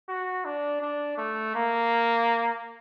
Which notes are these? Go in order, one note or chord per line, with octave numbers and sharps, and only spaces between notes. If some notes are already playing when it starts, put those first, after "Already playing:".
F#4
D4
D4
A3
A#3